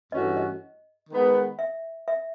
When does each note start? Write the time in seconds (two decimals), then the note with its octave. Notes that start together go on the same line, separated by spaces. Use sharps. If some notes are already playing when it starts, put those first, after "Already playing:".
0.12 G2 E3 A3 C#4 F#4 D#5
0.37 D#5
1.10 D#3 G#3 B3
1.59 E5
2.08 E5